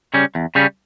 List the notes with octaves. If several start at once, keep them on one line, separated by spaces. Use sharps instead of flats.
C#3 G3 C#4
E2
C#3 G3 C#4